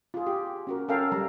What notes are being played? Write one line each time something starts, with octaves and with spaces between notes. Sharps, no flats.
F4 G#4
G4
C#4 F#4 A#4
C#4 A4 A#4 F5 G5
G3 A#5